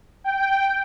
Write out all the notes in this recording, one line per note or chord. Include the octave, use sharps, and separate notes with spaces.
G5